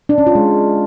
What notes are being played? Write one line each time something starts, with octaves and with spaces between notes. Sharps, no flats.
D4
C#4
F4
G#3